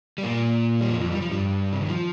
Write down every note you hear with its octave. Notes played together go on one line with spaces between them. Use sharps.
G3
A#2 A#3
G3
F2 F3
F2 F3
G3
F3
G2 G3
C3
D#3
F3